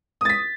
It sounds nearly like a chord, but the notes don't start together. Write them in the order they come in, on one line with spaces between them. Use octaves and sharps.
D#6 A6 B6